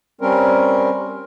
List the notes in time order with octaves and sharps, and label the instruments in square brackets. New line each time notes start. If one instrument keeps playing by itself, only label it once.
[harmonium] G3 C4 C#4 A#4